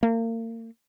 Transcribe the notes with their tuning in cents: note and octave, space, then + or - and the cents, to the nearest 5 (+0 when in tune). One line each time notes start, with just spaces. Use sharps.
A#3 -35